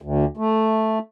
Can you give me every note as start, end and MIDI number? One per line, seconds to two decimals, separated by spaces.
0.02 0.25 38
0.37 0.98 57